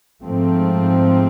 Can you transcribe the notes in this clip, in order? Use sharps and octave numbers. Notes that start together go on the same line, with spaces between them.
G#2 F3 A3 C4